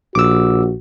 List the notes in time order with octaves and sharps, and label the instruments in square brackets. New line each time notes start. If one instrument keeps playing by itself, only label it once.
[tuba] A#1 [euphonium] F#4 [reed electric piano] D6 E6